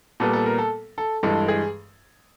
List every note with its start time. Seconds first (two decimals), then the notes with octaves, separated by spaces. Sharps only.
0.20 A#2 G3 B3 A4
0.33 A4
0.46 A#4
0.58 A4
0.98 A4
1.23 G2 E3 G#3 A4
1.48 G#4